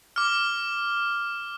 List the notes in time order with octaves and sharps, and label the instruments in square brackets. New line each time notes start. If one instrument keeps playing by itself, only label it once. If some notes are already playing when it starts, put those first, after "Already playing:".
[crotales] D6 F6